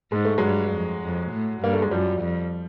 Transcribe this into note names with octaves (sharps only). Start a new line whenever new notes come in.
G#2 G#3
A3
G2 F#3 G#3
F2
F2
A2
G2 A#3
A3
G#3
F#2 F3 G3
F2